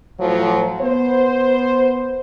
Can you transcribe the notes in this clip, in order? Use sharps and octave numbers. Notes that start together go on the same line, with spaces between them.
A2 F3 F#3
B3 C5